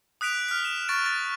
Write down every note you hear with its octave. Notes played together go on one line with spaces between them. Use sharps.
D#6 F#6 B6 D7 F7
F6 B6
E7
C#6 A6 D7
A6